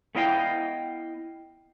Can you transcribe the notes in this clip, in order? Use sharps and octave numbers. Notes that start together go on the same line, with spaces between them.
A3 B3 E4 D#5 F5 G5